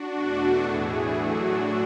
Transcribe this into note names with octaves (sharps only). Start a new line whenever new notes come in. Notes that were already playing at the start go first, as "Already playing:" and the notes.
Already playing: D4 F#4
E2 B2 A3
A2 E3 A3 E4 G#4
A2 F#3 A3 D4 F#4
F#2 C#3 D4 F#4